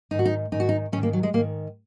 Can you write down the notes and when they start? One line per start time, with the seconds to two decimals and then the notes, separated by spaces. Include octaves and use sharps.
0.11 G#2 D#3 D#4
0.19 F#4
0.25 D#4
0.52 G#2 D#3 D#4
0.60 F#4
0.69 D#4
0.92 G#2 C#4
0.97 D#3
1.03 A#3
1.13 F#3
1.23 G#3
1.34 G#2 A#3
1.38 D#3